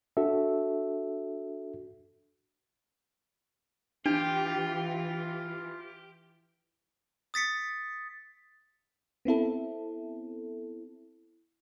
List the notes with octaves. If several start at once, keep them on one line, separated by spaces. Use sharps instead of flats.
D4 F#4 A4 E5
E3 D4 F4 G4
D#6 A6 B6 C#7
B3 C4 E4 A4